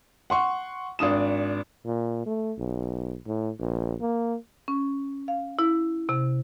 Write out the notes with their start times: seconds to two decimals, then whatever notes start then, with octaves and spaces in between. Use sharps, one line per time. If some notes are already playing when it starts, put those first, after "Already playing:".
0.30 F#5 C6 C#6
0.99 G#1 D4 D#6 E7
1.86 A#2
2.26 A3
2.58 B1
3.27 A2
3.59 A#1
4.01 A#3
4.68 C#4
5.28 F5
5.59 E4
6.09 C3